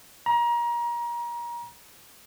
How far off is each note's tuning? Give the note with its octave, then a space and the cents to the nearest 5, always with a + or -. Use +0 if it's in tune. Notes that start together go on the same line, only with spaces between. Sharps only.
A#5 +30